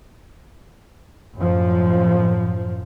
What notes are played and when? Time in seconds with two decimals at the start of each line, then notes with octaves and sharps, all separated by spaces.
1.35 F#2 A2 F3